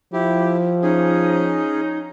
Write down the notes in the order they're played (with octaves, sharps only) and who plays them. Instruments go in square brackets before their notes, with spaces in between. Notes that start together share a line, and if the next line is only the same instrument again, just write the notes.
[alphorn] F3 [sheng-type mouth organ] E4 G4
[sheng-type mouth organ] C#4 G#4 [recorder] D#4